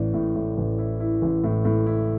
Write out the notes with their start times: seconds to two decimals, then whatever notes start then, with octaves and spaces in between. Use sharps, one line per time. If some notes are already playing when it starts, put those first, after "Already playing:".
Already playing: A1 A2 D5
0.14 A2
0.35 A2
0.58 A1
0.79 E4
1.00 E4
1.22 A1
1.44 A2
1.65 A2
1.86 E4